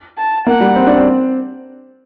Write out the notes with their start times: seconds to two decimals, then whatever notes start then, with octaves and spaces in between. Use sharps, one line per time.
0.18 A5
0.46 A#3 F#5
0.60 G3
0.76 C4
0.86 D4
0.96 C4